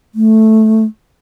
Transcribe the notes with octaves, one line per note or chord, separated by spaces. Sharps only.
A3